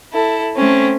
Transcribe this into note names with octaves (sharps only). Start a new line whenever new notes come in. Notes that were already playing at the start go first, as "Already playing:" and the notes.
E4 A4
A3 C4 C#4